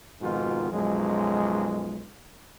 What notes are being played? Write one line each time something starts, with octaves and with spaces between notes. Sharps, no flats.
F2 G#2 B2 D#3 F4 F#4
B1 F#2 F3 G#3